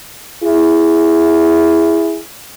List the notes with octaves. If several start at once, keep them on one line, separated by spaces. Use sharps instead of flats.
E4 G#4